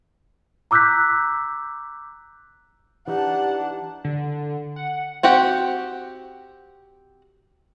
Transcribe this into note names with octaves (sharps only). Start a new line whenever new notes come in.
A#5 D6 E6 F#6 G6 B6
E3 D4 D#4 G4 F#5 A5
D3
F#5
C4 F#4 G4 F#5